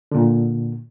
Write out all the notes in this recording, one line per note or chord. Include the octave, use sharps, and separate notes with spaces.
A#2 D3